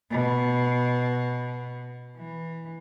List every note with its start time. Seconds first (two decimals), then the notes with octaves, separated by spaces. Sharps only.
0.11 B2
2.17 E3